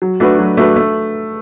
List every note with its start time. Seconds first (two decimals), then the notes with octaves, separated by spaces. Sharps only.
0.02 F#3
0.20 A3 D4 F#4 B4
0.39 F#3
0.57 A3 D4 F#4 B4
0.76 A3